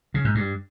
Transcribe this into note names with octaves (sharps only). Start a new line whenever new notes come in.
C#3
G#2
G2